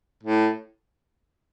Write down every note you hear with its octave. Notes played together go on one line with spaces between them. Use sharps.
A2